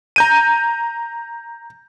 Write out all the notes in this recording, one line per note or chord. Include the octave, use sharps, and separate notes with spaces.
A#5 G6 D#7